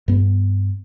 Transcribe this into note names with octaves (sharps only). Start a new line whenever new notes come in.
G2 B3